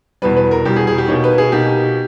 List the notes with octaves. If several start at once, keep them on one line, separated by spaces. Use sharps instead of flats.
E2 B2 G3 B4
B4
A#4
E2 B2 G3 G4
G#4
G#4
G4
B2 A#3 D#4 C#5
B4
G#4
B2 A#3 D#4 G4